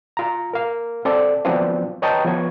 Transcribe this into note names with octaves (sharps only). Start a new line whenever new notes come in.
F4 A#5
A#4 F5
C4 A4 D5
F3 F#3 B3 C4 D4 F4
B4 C#5 D#5 G5 A5 A#5
F3 B3 F4 C#5 G#6